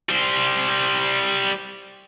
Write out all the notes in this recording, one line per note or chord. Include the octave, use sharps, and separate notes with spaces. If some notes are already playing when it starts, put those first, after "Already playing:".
G3 C5